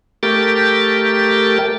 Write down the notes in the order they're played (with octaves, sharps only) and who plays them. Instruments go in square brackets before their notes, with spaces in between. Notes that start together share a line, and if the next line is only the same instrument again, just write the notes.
[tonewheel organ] A3 G4 A#4 G5 A6